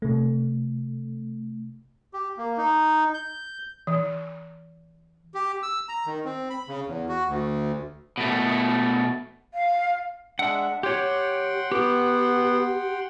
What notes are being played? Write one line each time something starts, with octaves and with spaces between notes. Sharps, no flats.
C3 A3
G4
A#3
D#4
G6
E3
G4
E6
A#5
D#3
C4
B5
C#3
E2
F#4
D2
B2 A3
F5
G#3 D4 E5 F#5
G4 C#5 F#5 G5 C6
B3 G4